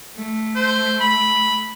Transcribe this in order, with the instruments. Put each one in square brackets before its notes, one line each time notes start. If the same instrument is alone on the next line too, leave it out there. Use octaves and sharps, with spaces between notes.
[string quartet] A3
[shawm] C5
B5